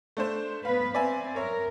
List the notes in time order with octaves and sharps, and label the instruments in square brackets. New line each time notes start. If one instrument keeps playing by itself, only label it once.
[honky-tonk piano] A3 D4 C5
[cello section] B3 B4 [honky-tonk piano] F5
[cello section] C4 [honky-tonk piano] D5 E5 G#5
[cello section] A#4 [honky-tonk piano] C#5 E5